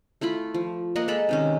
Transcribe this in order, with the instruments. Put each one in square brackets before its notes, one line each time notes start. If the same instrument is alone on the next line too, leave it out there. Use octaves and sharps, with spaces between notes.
[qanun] A3 E4 F4 B5
F3
A#3 A#4 D#5 F#5
G#3 A4 B5
C3 D#3 C#4